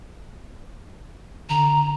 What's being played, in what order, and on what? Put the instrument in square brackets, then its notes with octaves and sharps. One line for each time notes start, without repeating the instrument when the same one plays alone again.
[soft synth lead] D3 [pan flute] A#5